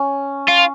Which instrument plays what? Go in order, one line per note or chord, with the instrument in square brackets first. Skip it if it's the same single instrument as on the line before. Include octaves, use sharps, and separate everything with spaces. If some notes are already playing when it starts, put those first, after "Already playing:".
Already playing: [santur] C#4
[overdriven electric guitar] F4